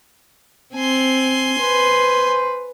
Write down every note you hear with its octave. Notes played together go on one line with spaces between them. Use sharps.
C4 G#5 C6
B4 C5